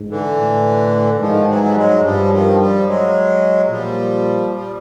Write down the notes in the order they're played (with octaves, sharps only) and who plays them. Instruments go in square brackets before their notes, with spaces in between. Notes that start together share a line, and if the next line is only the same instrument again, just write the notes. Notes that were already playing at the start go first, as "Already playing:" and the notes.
Already playing: [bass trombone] G#2
[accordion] D3 E3
[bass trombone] A2
[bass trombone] G#2 [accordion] D#3 F3
[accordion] E3 F#3
G3
F#3 G#3
[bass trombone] G2 [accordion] F3 G3
[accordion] F#3
D#3 F3
F3 G3
F#3 G#3
[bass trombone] A#2 [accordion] F3 G3
[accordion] F3 G3